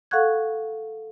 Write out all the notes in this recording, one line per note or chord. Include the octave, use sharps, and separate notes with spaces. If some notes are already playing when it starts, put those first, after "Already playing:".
A4 F5 F#5 C#6 F#6 G#6